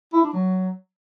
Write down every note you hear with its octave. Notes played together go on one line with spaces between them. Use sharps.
E4
D4
F#3